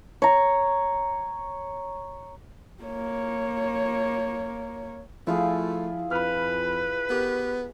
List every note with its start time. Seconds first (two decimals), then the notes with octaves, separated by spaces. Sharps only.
0.22 C#5 A#5
2.83 A#3 C#5
5.27 F3 A3 E4 F4 G#4
6.11 F2 B4 B5 F6
7.10 B3 G4 A#4